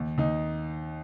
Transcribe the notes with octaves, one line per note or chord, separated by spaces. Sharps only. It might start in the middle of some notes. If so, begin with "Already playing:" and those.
Already playing: D#2
D#2 D#4